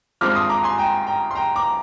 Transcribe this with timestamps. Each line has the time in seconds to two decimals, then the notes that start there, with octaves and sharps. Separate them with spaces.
0.21 G#1 G2 F3 G#3 C4 D6 F6
0.35 C6 D#6
0.49 A#5 D6
0.64 G#5 C6
0.78 G5 A#5
1.07 G5 A#5
1.31 C6
1.36 G5 A#5
1.56 A#5 D6